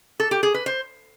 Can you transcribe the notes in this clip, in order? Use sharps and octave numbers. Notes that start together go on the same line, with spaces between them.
A4
G4
G#4
B4
C5